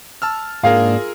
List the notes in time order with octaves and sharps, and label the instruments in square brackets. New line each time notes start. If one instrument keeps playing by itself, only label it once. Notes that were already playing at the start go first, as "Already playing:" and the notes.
[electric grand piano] A5 E6 F6
[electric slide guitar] G#2 A#3 D4 [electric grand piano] F4 G#4 A#4 [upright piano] F5